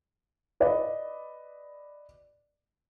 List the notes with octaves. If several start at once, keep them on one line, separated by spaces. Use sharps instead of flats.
B4 D5 D#5